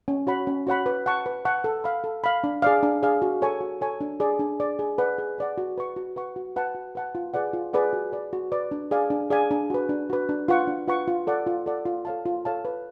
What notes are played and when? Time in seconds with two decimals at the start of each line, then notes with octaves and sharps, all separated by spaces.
0.08 C#4
0.27 F#4 C#5 F#5 B5
0.47 C#4
0.67 F#4 C#5 F#5 B5
0.86 B4
1.06 F#5 A5 C#6
1.26 B4
1.45 F#5 A5 C#6
1.64 A4
1.84 F5 B5
2.04 A4
2.24 F5 B5
2.44 D4
2.62 G#4 D5 F5
2.83 D4
3.03 G#4 D5 F5
3.22 F#4
3.42 A4 C#5 G#5 C#6
3.61 F#4
3.81 A4 C#5 G#5 C#6
4.01 D4
4.20 G#4 D5
4.39 D4
4.60 G#4 D5
4.79 G#4
4.98 B4 D5 F#5
5.18 G#4
5.38 B4 D5 F#5
5.58 F#4
5.78 B4 F#5 C#6
5.96 F#4
6.16 B4 F#5 C#6
6.36 F#4
6.56 B4 F#5 A5
6.75 F#4
6.95 B4 F#5 A5
7.15 F4
7.34 G#4 B4 D5 F#5
7.53 F4
7.73 G#4 B4 D5 F#5
7.93 F#4
8.12 B4 D5
8.33 F#4
8.52 B4 D5
8.71 D4
8.91 G#4 D5 F5 G#5
9.10 D4
9.31 G#4 D5 F5 G#5
9.51 D4
9.70 F#4 B4
9.89 D4
10.10 F#4 B4
10.29 D4
10.48 F4 B4 F#5 C#6
10.67 D4
10.88 F4 B4 F#5 C#6
11.08 F4
11.27 A4 D5 F#5
11.47 F4
11.66 A4 D5 F#5
11.86 F4
12.05 A4 C#5 F5 A5
12.26 F4
12.45 A4 C#5 F5 A5
12.65 B4